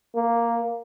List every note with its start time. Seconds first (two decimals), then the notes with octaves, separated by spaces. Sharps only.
0.15 A#3